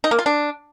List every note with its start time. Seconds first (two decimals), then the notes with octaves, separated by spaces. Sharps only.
0.04 D#4
0.11 A#3
0.19 F4
0.26 D4